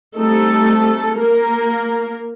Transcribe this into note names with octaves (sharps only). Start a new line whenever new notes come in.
G3 A3 C4 D#4 A4
A#3 A#4